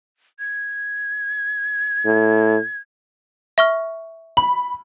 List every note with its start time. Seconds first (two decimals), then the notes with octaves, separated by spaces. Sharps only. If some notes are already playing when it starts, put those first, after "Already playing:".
0.39 G#6
2.05 A2
3.58 E5 C#6 F6
4.37 B5 F#7